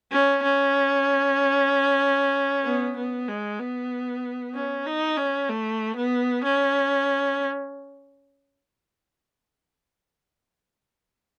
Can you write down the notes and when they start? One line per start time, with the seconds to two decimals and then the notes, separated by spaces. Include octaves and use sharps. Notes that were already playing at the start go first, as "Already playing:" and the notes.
0.12 C#4
0.43 C#4
2.64 B3
2.97 B3
3.28 G#3
3.60 B3
4.54 C#4
4.86 D#4
5.17 C#4
5.49 A3
5.97 B3
6.44 C#4